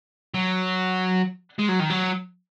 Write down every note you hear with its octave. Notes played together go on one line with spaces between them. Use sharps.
F#3
G#3
F#3
D#3
F#3